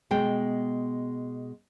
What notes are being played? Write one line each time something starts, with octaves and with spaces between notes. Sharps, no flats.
B2 G#3 G5